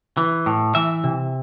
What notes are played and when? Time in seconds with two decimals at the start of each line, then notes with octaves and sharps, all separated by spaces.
0.17 E3
0.46 A2
0.75 E3 E5
1.04 C3